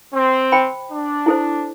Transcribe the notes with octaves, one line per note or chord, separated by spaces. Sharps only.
C4
C5 G5 B5
D4
E4 A4 C5